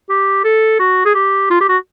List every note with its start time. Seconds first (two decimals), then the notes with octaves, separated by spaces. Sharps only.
0.09 G4
0.44 A4
0.79 F#4
1.05 G#4
1.15 G4
1.50 F4
1.61 G4
1.69 F#4